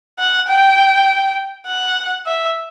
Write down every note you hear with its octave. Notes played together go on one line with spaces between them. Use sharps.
F#5
G5
F#5
E5